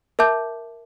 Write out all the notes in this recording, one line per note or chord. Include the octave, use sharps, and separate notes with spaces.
A#4 E5 A5 D6 G6